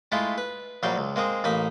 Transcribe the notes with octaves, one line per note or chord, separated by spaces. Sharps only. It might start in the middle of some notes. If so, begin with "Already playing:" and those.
G#3 A3 E4 F4
B4
A#1 F#3 G3 F5 G5
C#2
G#3 A#3 C4 G#4
A1 A#3 D#4 B5